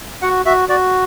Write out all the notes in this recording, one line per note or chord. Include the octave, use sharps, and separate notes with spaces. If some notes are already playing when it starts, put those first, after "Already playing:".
F#4 F#5
F#4 E5
F#4 D5